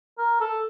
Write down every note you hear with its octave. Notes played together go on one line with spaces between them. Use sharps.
A#4
A4